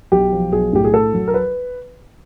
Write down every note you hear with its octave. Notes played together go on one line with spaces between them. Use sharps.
B1 G4
F3
B1 G#4
A2 G4
G#4
A3 A4
F#3
A#4
B4